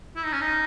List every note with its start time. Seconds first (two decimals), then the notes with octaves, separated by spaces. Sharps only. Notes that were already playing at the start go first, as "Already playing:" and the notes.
0.16 E4
0.24 D#4
0.33 C#4
0.41 D#4